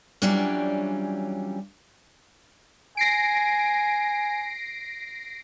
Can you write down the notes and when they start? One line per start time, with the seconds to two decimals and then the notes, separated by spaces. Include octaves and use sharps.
0.22 E3 F#3 G3 C#4 D4 F4
2.97 G#5 A#6 C7 D7